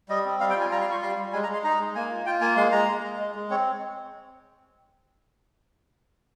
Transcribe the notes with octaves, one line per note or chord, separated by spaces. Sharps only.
G3 D#5
C4
G3 F5
G5
F4 G#5
G3 A#5
C6
F4 C#6
G3 C6
G3
G#3 G#5
A#5
G#3 C6
D#4 A#5
G#3
A#3 G#5
F4
F4 G5
A#3 G#5
G#3 C6
G#3 A#5
G#3
G#3
G#3
G#3
C4 C#5